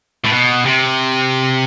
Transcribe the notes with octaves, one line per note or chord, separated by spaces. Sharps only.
A2
B2
C3